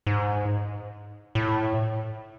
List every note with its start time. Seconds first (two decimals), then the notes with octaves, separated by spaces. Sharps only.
0.07 G#2
1.35 A2